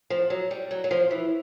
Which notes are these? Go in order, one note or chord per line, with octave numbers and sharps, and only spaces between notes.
F3
F#3
G3
F#3
F#3
F3
E3